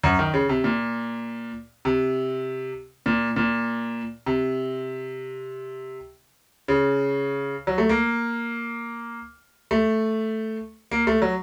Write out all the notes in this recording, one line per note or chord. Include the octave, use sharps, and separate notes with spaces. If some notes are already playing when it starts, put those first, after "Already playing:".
F#2
D#3
C#3
C3
A#2
C3
A#2
A#2
C3
C#3
F#3
A3
A#3
A3
A#3
A3
F#3